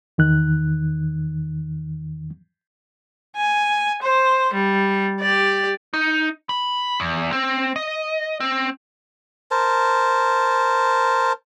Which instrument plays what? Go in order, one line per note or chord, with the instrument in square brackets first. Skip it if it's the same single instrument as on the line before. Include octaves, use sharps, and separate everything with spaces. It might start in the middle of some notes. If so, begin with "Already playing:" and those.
[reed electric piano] E2 D#3 F#6
[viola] G#5
C5
G3
G4 D5
[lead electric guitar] D#4
B5
E2
C4
D#5
C4
[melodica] A#4 C5 A5